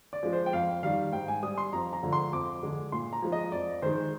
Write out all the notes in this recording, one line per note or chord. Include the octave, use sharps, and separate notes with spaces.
D5
F3 G#3
C5
G5
F2 F5
D#3 G3 F5
G#2 G5
G#5
G3 D#6
C6
F2 A#5
A#5
D3 F3 G#3
C6
F2 D6
D3 G#3
A#2 C6
A#5
F3 G#3
D#5
F2 D5
D#3 G#3 C5